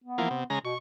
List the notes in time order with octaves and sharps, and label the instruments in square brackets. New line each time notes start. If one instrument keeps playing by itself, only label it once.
[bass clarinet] B3
[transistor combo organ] E3 F3 A#3
C3
C#3 G#3 A#5
[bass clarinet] B2 [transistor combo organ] C#6